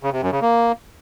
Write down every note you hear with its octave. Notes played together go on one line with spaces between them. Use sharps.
C#3
C3
F#2
C#3
A#3